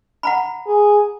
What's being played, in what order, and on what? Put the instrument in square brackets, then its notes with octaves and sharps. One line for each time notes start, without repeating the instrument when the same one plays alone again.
[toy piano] F#5 A#5 B5
[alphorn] G#4